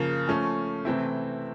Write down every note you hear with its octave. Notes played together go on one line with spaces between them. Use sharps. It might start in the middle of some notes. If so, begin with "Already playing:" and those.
Already playing: C#3 F3 A#3
F3 A3 C#4
C3 E3 A3 C4 E4